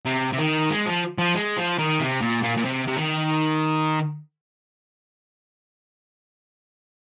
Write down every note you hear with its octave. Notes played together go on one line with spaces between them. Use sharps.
C3
C3
D#3
G#3
F3
F3
G#3
F3
D#3
C3
A#2
A#2
A#2
C3
C3
D#3